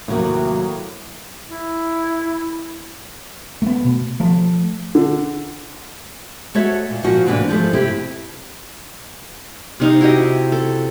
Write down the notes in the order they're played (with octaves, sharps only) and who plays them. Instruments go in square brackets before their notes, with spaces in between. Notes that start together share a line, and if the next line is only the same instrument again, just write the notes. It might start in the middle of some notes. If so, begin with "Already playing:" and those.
[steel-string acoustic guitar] D#2 C3 F#3 [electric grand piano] A2 A#3
[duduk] E4
[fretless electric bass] A3 B3
B2
F3 A3
[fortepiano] D3
[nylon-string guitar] A3 F#4 C#5 E5
A#2
A#2 F3 F#4
A2 C3 E3 A3 A#3 D4
F3 G#3 A3
C3 E4 G4
[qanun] C3 D#4 F5
E4 F#4 G4 D#5
A4